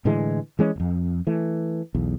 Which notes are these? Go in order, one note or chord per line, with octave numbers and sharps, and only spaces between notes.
A2 D3 E3 G#3
E3 G#3 C#4
D1 F2
E3 A3
B1 E2